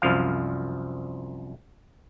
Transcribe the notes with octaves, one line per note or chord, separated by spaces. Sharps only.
C2 F#2 F3 F5